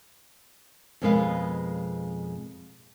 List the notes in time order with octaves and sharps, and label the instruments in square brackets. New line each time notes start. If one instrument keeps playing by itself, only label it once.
[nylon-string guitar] F2 B2 G#3 A#4 B4 F5